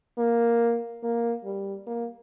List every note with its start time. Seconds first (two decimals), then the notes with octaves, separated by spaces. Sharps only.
0.18 A#3
1.03 A#3
1.45 G3
1.87 A#3